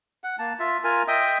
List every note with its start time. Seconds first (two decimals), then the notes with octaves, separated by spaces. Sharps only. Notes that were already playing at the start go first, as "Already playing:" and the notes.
0.24 F#5
0.39 A#3 A5
0.59 F4 E5
0.84 F4 A#4 G#5
1.08 D#5 E5 G5 D#6